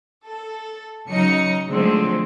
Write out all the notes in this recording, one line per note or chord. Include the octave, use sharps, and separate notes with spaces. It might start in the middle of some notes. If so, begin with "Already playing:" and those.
A4
C#3 F#3 D#4 C#7
D3 F3 F#3 G#3 A3 C4